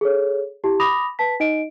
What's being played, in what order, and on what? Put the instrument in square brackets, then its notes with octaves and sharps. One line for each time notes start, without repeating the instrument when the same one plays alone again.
[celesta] G#4 A4 C#5
E4 G4 A5
B5 D6 D#6 A#6 F7
B4 A5 B6
D#4 D#5 D7